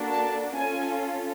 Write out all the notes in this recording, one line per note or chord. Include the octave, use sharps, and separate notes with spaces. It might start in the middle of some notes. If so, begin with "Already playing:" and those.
Already playing: A#3 D4 F#4 A4
A5
C#4 F4 A4 G#5